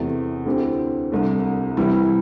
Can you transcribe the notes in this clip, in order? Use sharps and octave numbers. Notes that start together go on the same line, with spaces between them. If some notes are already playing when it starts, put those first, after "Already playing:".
Already playing: E2 C3 A3
D2 D3 C4 E4 G4
C2 C3 A3 D4
C3 E3 G3 E4